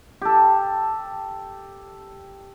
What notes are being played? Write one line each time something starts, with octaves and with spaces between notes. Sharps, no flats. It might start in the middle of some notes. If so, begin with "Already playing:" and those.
G4 A4